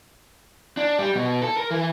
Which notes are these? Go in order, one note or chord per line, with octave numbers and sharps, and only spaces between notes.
D4
G3
B2
A4
A#4
E3